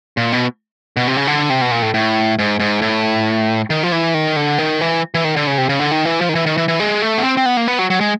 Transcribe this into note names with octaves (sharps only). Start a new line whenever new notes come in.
A#2
B2
B2
C3
C#3
D3
C3
B2
A#2
A2
A2
G#2
G#2
A2
D#3
F3
E3
D#3
D3
D#3
E3
E3
D#3
D3
C#3
C3
C#3
D3
D#3
E3
F3
D#3
E3
D#3
E3
E3
G#3
A3
B3
C4
C4
B3
A#3
B3
F#3
F#3
G#3